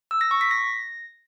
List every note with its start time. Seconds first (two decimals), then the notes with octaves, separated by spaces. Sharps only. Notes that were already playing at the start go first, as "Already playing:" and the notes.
0.11 E6
0.21 A#6
0.31 C#6
0.41 B6
0.51 A#6